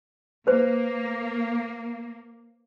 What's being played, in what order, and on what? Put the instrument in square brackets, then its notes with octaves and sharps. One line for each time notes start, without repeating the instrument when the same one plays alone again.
[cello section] A#3 [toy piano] B4 C5